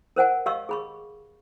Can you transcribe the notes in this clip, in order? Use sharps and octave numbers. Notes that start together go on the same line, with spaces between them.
A#4 C5 F#5 G#5
G4 D#5 F5 C#6 E6
G#4 B5 C#6